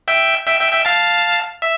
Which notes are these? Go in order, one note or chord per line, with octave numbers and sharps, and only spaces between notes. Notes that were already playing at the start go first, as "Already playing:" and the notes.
E5 G5
E5 G5
E5 G5
E5 G5
F5 A5
E5